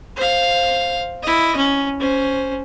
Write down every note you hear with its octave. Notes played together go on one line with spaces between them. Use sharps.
C5 F5
E4 D#5
C#4
C#4 C5